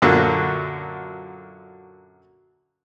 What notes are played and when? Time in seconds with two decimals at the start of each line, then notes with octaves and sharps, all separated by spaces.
0.02 F#2 A#2 D3 F#3 A#3 F#4